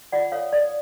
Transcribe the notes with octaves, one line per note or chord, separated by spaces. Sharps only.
F4 D5 F#5
A4 C#5 F5
A4 D5